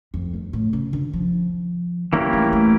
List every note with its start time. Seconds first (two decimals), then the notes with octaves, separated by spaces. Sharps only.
0.14 F2
0.34 G2
0.53 A2
0.73 C#3
0.93 D3
1.14 F3
2.12 E3 G3 A#3 C#4 E4 G4
2.33 A3
2.44 G3
2.53 A3